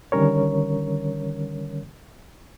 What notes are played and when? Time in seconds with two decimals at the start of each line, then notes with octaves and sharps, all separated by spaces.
0.12 D3 D#3 G3 C#4 A#4 C#5